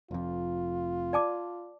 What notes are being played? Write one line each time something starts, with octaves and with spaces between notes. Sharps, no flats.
F1 F2 F4
D5 A5 D6